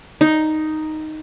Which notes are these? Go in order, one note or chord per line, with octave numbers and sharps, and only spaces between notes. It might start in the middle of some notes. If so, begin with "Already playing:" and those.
D#4